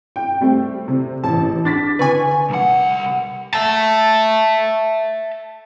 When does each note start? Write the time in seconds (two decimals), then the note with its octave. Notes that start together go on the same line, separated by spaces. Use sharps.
0.16 G5
0.41 G3 A3 C4
0.88 C3
1.24 A1 A5
1.65 D4 D6 A6 B6
1.99 D3 B4 G#5 C#6
2.50 C2 F#5
3.54 E5 A5